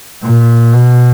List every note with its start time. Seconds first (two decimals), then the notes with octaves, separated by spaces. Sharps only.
0.23 A#2
0.74 B2